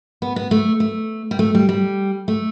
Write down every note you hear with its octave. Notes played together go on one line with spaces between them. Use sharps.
B3
B3
A3
A3
G3
A3
G3
G3
A3